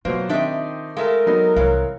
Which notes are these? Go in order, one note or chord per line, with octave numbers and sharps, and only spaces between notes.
B2 F#3 A#3 F4 C5
D#3 C4 D4 D#4 G4 E5
G#3 A3 A#4 E5 F5
F#3 B3 D#4
C2 G#2 E3 C#5 F5